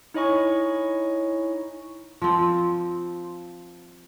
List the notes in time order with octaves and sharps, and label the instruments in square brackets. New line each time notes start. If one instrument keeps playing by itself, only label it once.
[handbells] D#4 E4 C#5 D#5 G#5 C#6
[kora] F3 C4